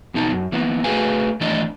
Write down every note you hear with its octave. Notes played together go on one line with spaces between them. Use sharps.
E2 B2 D#4 A5
F#2
E3 A#3 B3
A3 F#4 G#4 B4 F5 G#5
D#3 E3 A3 D4 D5 D#5